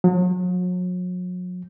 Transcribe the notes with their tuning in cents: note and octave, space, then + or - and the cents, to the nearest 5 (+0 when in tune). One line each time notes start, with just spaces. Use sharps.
F#3 -40